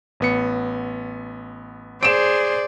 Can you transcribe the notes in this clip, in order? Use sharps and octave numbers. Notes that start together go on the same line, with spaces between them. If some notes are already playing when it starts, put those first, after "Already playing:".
A1 B3 C#7
G#4 C5 D5 D7 E7